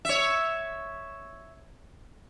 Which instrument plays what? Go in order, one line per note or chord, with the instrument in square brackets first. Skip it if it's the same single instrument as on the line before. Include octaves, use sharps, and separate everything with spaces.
[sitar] C#5 E5